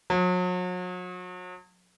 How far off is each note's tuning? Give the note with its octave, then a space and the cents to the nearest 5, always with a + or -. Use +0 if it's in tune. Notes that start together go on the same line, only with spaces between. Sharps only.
F#3 -40